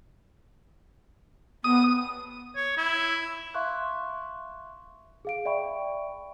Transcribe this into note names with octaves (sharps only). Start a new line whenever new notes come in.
B3 D#6
C#5
E4
E5 F5 C6 C#6 F#6
G#4 F5 D7
D5 E5 G5 B5 C#6